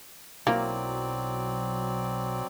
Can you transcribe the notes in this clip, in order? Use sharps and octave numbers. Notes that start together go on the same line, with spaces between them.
B1 F#3 A#3 C4 E4 D5 A#5